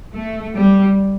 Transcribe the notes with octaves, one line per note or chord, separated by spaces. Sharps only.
A3
G3